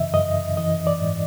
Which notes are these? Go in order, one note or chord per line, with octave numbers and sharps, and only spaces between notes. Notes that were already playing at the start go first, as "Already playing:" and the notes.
Already playing: F#2 C#3 E3 D#5 E5
F#2 D#5
E3 D#5
D5
G#2